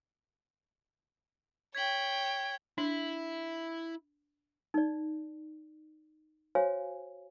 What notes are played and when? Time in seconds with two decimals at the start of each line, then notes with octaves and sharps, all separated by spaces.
1.75 C#5 G5 G#6 B6 F#7
2.78 D4 E4
4.74 D#4 D5
6.55 F#4 C5 C#5 F5 G#5